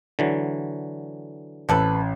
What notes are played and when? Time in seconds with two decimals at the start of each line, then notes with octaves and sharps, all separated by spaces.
0.19 D3 E3 F#3
1.69 A1 C4 A4 B4